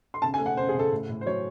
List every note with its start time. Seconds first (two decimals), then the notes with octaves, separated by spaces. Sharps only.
0.14 C6
0.22 C#3 A5
0.34 G#5
0.39 A3
0.46 F#5
0.57 C#3 C5
0.69 G#4
0.74 C#3
0.79 A4
0.91 A2
1.09 A2
1.21 C5
1.26 F#3 C#5